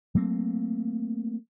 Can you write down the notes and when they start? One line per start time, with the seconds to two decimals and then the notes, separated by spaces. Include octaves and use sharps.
0.15 F#3 A3 A#3 C4